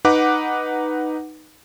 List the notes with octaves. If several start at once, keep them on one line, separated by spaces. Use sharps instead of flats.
D#4 B4 F#5 D6